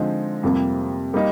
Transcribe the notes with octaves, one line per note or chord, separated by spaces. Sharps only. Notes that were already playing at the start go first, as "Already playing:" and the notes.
Already playing: D3 F3 G#3 C4 D#4
F2 C3 G3 A#3
G3 A#3 D#4